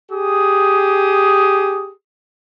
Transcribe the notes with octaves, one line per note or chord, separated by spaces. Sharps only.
G4 G#4 D#6